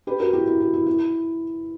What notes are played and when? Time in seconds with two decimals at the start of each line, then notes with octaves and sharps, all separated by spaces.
0.07 G4 B4
0.20 F#4 A#4
0.33 E4 G4
0.47 E4
0.60 F#4
0.73 E4
0.86 E4